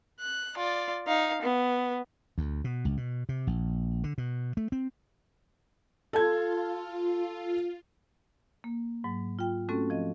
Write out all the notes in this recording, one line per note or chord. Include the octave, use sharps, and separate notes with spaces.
F#6
F4 D5
D#4 F5
B3
D2
B2
C#2
B2
C3
A#1
D3
B2
A3
C4
F4 A4 A5 G#6
A#3
G#2 F#3
F4 G5
A3 C4 C#4 F#4 A4
F3 D#5